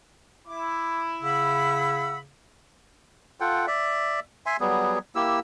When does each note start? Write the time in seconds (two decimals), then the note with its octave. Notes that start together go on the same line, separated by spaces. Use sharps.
0.46 E4 D6
1.22 C#3 F#5 B5 E6
3.40 F4 A4 F#5 G5
3.67 D5 E5
4.46 E5 G#5 C6
4.60 F#3 G3 B3 G#4
5.15 A#3 E4 G4 E6